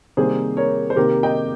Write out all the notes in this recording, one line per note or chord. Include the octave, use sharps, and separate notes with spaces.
C3 D#3 G3 A#3 G#4 C5
A#4 C#5
C5
C3 D#3 A#3 G4 A#4
D#5 G5